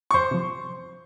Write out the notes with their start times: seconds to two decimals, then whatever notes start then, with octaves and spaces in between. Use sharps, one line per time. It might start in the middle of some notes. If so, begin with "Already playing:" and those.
0.11 C#6
0.14 F2 C5 C6
0.31 C3 F3